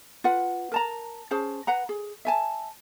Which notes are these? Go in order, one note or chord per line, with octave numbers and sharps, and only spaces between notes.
F4 B4 F#5
A#4 A5 A#5
C#4 G#4 C5 A5
B4 F#5 A#5
G#4
E5 G#5 A5